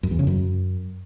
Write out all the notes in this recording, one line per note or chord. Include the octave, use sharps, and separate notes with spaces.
F#2
E2
C#3
F#2